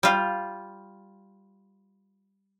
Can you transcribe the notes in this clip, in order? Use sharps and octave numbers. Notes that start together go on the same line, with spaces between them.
G3 F4